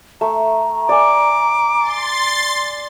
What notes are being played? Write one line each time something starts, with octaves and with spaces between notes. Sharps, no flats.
A3 A#5
D5 G#5 D6
C6 A6